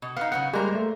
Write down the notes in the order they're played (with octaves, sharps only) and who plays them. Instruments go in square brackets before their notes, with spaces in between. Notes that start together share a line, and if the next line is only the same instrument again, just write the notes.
[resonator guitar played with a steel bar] B2
[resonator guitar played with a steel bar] B3 D#4 [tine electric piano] F5
[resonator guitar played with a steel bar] C#3 F#3 B3 [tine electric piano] F#5
[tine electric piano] G3 G#3 [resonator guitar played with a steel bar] A#3 A#4 C5
[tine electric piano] A3